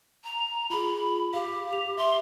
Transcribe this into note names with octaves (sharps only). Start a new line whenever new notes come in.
A#5
F4 G#4 B5
G4 F5
F7
E5 C6